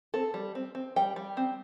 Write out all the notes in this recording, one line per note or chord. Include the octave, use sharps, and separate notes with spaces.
C4 A4
G3
C4
C4
G3 G5
G3
C4